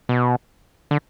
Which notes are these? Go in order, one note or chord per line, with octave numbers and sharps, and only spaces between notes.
B2
D3